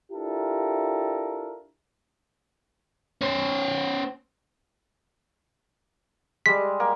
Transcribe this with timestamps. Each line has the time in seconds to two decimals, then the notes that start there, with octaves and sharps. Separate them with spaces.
0.12 D4 E4 F4 G4 A4 A#4
3.21 C#4 C5
6.46 G3 G#3 B6
6.80 A#3